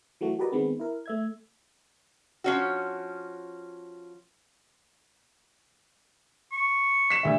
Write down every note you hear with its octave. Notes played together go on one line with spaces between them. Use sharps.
E3 F#3 A3 F#4
F#4 G4 A#4 B4 D5 D#5
D#3 G#3 B3 C4
E4 A#4
A3 E5 G#6
F3 C#4 F#4
C#6
B6 E7
D2 G3 E5